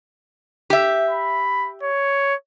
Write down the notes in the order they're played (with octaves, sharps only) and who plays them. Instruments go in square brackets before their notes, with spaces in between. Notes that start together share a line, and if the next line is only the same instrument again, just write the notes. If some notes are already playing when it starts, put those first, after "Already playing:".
[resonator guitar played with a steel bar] G4 E5
[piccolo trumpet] B5
C#5